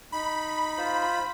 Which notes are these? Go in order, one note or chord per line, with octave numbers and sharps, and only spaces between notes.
D#4 B5
F4 C5